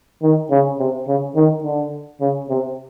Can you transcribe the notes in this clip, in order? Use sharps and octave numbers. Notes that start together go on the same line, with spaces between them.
D#3
C#3
C3
C#3
D#3
D3
C#3
C3